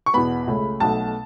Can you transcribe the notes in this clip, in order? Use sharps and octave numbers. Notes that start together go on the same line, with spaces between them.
C#6
E2 B2 B3 B5
C#2 C#3 A3
B1 B2 A3 A5